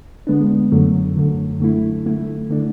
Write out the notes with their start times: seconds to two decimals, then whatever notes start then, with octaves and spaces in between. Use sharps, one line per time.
0.27 D3 G#3 B3 D4
0.72 F#2 D3 F#3 A3
1.16 F#2 D3 F#3 A3
1.60 D3 A3 E4
2.05 D3 A3 E4
2.50 D3 A3 D4